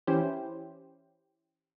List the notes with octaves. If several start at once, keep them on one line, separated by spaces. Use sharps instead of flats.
E3 C#4 E4 G4 C5